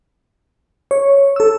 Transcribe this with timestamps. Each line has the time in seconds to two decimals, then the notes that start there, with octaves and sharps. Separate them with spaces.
0.91 C#5
1.36 A4 E6